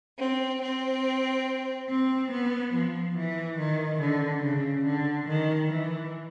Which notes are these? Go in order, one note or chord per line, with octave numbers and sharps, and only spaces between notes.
C4
C4
C4
B3
F3
E3
D#3
D3
C#3
D3
D#3
E3